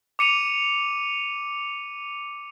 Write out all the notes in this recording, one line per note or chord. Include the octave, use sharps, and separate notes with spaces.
D6 C#7 D#7 F7